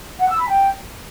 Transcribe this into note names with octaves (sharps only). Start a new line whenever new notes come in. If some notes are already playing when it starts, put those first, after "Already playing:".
F#5
E6
B5
G5